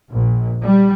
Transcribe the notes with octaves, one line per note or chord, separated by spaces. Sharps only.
A#1
G3